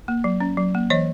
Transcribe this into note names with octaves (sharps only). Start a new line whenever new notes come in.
A#3
F#3
C#4
F#3
A#3
E3 C#5 D#5